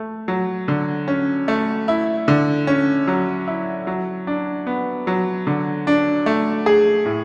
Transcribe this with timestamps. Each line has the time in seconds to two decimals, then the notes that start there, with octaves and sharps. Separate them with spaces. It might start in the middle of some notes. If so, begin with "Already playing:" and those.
Already playing: A3
0.28 F#3
0.68 D3
1.08 C#4
1.48 A3
1.88 E4
2.28 D3
2.67 C#4
3.08 F#3
3.47 E4
3.87 F#3
4.27 D4
4.67 B3
5.07 F#3
5.47 D3
5.87 D4
6.26 A3
6.66 G#4
7.05 A2